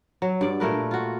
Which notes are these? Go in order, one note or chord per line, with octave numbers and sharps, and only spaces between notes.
F#3
G2 D5
A#2 A3 A#4 B4
F4 F#4